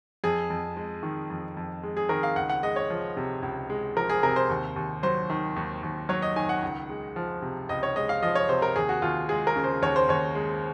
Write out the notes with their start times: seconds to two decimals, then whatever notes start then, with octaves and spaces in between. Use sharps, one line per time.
0.24 F2 G#4
0.50 F2
0.77 G#3
1.03 D#3
1.30 F2
1.57 F2
1.83 G#3
1.97 G#4
2.09 D#3 A#4
2.23 F5
2.36 C#2 F#5
2.50 F#5
2.63 G#3 D#5
2.76 C#5
2.90 F3
3.17 C3
3.43 C#2
3.70 G#3
3.96 F3 A#4
4.10 G#4
4.23 C3 A#4
4.36 C5
4.49 D#2
4.76 D#2
5.03 F#3 C5
5.30 D#3
5.56 D#2
5.83 D#2
6.09 F#3 C#5
6.22 D#5
6.36 D#3 G#5
6.49 F#5
6.63 C#2
6.89 G#3
7.16 F3
7.42 C3
7.69 C#2 D#5
7.83 C#5
7.96 G#3 D#5
8.09 F5
8.22 F3 D#5
8.35 C#5
8.49 C3 C5
8.62 A#4
8.76 D#2 G#4
8.89 F#4
9.02 D#2 F4
9.29 G#3 G#4
9.47 A#4
9.56 C#3
9.64 C5
9.82 D#2 C#5
9.96 C5
10.09 D#2 C#5
10.35 G#3